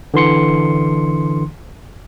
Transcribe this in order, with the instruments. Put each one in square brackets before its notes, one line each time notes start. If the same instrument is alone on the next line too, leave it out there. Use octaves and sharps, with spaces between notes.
[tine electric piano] D3 E3 C6 C#7